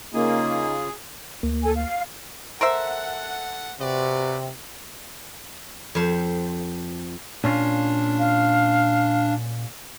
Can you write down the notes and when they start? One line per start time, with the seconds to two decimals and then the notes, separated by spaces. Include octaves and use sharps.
0.14 C#3 A#3 C#4 D#4 F4 G#4
1.43 D2 A#3
1.62 A4 G#5
1.75 F5
2.61 A4 A#4 C5 E5 F#5
3.80 C3 F#4 B4 D5
5.95 F2 C5
7.44 A#2 C#4 D4 F4
8.19 F5